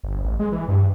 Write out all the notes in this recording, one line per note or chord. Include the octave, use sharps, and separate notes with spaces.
G1
A1
G#3
E3
G2